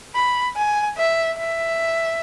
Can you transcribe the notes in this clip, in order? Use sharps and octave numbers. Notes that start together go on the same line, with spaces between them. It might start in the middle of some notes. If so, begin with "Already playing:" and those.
B5
G#5
E5
E5